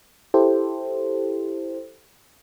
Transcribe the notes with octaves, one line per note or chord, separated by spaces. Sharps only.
E4 G4 A4 C5